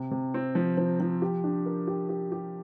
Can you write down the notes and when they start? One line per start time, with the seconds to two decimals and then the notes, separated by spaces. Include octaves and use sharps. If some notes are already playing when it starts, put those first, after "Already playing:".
Already playing: C3
0.11 C3
0.34 C4
0.55 F3
0.77 F3
1.00 F3
1.22 G4
1.44 D4
1.66 A#4
1.87 G4
2.09 G4
2.32 G4